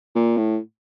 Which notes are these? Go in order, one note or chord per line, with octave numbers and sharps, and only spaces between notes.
A#2
A2